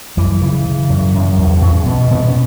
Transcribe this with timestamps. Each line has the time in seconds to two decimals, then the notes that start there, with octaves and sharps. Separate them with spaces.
0.17 F#2 E3
0.42 C#3 E3
0.66 C#3
0.90 F#2
1.15 F#2
1.38 E2 F#3
1.62 E2 C#4
1.86 B2 B3
2.11 B2 B3
2.29 C#4